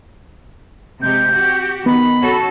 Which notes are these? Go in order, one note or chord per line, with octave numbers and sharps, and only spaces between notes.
C3 G#3 G4 G6
F#4 G4
D#3 B3 B5
C#4 F#4 A4